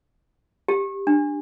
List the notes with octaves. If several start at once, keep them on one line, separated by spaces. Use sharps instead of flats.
G4
D4